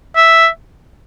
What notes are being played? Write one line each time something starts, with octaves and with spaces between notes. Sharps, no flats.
E5